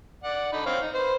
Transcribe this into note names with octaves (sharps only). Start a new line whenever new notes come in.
D5 F#5
D3 D#4 B5
C4 C#5 F5
D#4
B4 C5